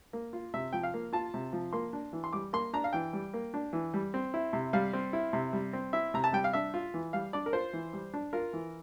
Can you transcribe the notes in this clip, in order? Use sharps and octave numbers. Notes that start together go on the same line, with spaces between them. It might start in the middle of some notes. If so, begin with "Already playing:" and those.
A#3
F4
C3 E5
F3 G5
F5
A#3
F4 A5
C3
F3
A#3 C6
D4
E3
C6
G3 D6
A#3 C6
D4 A#5
F5
E3 G5
G3
A#3
D4
E3
G3
C4
E4
C3
G3 F5
C4
E4
C3
G3
C4
E4 E5
C3 A#5
A5
G3 G5
F5
D4 E5
F4
E3
G3 F5
D4 D5
A#4
F4 C5
E3
G3
D4
F4 A#4
E3